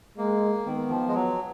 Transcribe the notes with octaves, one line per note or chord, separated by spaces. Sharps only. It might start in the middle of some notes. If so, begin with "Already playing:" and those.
G#3 A#3
D#3 B3
F3
G#3
F#3